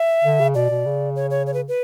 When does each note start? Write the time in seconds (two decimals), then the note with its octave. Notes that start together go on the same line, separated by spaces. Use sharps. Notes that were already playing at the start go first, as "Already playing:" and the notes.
Already playing: E5
0.24 D3
0.40 C#3
0.54 B2 D5
0.70 B2
0.86 C#3
1.16 C#5
1.31 C#5
1.47 C#5
1.54 B4
1.68 B4